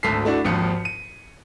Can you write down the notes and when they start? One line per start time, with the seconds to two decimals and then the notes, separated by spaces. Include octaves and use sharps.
0.03 G#1 D2 A4 B6 C7
0.25 A3 D4 E4 F#4
0.45 G#1 D#2 F3 D#6 C#7
0.85 D#7